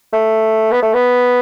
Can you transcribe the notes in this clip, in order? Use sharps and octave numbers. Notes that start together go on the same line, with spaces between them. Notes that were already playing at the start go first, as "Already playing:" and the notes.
A3
B3
A3
B3